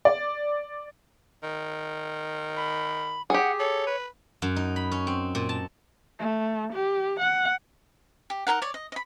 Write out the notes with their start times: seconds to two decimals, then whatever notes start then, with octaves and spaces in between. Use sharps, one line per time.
0.05 D5
1.43 D#3
2.57 B5
3.30 G4 G#4 F#5
3.60 A4 C#5
3.87 B4
4.42 F#2
4.56 D#4
4.76 B5
4.92 C#4
5.07 C4
5.35 A#2
5.49 A5
6.19 A3
6.73 G4
7.20 F#5
8.30 G4
8.47 D#4 G#4 A#4 F#5
8.62 C#5 D5
8.74 D#5
8.92 D#5 B5